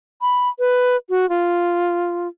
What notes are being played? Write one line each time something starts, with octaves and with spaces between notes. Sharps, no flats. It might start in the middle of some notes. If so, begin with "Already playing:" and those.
B5
B4
F#4
F4